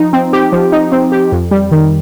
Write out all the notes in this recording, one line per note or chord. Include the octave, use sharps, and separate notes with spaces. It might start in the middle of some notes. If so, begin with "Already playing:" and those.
Already playing: F3 D#4
C4
G4
F3
D#4
C4
G4
F2
G3
D#3